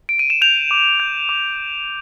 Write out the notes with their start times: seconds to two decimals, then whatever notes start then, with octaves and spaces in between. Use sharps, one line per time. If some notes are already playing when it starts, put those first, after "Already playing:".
0.09 D7
0.19 D#7
0.30 E7
0.42 G6 F7
0.71 D6
1.00 G6
1.29 D6